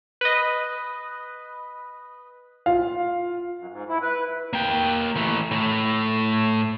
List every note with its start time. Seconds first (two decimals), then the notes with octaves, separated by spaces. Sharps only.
0.21 B4 D#5
2.66 F4 F5
3.58 F#2
3.71 G#2
3.89 E4
4.02 B4
4.53 A#3 G5
5.16 E3 A3
5.51 A2 A3